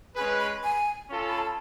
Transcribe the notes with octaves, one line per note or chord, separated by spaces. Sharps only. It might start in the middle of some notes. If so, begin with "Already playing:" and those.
G#3 C#4 G#4 B4 B5
B5
G#5
C#4 F4 A4
B5
A5